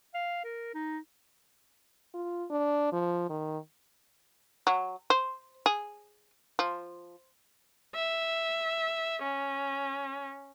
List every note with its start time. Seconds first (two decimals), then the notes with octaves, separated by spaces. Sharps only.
0.14 F5
0.44 A#4
0.75 D#4
2.14 F4
2.50 D4
2.92 F3
3.29 D#3
4.67 F#3
5.10 C5
5.66 G#4
6.59 F3
7.95 E5
9.23 C#4